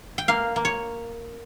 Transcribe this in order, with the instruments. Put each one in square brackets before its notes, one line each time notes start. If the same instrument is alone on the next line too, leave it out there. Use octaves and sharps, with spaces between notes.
[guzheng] G5
A#3 F5
A#3
C#5